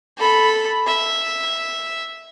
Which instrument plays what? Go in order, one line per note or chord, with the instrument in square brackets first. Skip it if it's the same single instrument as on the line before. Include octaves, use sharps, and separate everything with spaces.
[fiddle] A4 B5
E5